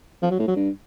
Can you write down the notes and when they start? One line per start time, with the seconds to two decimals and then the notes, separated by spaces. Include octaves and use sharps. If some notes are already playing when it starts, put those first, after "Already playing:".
0.22 F3
0.31 F#3
0.39 A2
0.48 F#3
0.56 G2